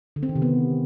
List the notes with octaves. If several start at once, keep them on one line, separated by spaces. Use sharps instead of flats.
D3
C4
D#3
C3
B3